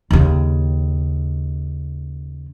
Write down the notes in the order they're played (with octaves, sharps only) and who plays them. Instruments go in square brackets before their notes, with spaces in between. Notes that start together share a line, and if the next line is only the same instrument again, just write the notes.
[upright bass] D#2 C#3